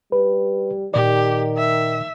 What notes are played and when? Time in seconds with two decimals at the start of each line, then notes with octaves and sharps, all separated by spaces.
0.12 G3 B4
0.94 A#2 D#3 G4 D5
1.57 E5